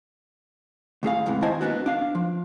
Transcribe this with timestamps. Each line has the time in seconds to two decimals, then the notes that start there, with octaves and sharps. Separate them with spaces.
1.03 D2 A2 G#4 F5
1.26 E2 G#2 C3 E3
1.42 D#3 E4 C5 D#5 G#5 A5
1.61 A#3 B3 C#4 D4 F#4
1.86 D4 F5
2.15 F3